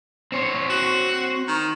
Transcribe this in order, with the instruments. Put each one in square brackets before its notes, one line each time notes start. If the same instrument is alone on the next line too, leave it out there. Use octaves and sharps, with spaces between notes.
[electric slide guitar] C4 C#5
[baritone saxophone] F#4
D#3